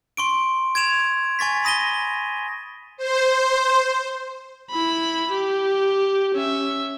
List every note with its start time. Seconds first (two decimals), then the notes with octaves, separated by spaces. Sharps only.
0.17 C6 C#6 D7
0.75 G#6 D7 E7 F7
1.39 G#5 C#6 A6 B6
1.64 B5 D#6 A#6 D#7 G7
2.97 C5
4.70 E4 B5
5.31 G4
6.34 C#4 E5